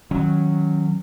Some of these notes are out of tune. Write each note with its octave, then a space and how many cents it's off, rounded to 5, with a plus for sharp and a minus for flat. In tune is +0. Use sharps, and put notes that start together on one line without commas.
D#3 +10 F#3 -10 C#4 -10